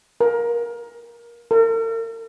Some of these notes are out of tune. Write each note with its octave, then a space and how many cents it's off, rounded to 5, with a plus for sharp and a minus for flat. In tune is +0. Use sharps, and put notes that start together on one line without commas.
A#4 +20
A#4 -45